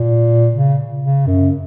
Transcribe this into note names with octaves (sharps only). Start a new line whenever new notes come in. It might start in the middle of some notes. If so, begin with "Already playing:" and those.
Already playing: A#2
C#3
C#3
F#2